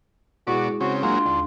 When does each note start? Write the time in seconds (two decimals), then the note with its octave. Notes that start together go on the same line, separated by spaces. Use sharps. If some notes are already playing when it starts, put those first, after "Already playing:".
0.47 B2 G#3 E4 F#4 G#4 D5
0.80 C#3 C4 F#4
1.03 F#3 G#3 A#3 D4 F4
1.26 D#2 D3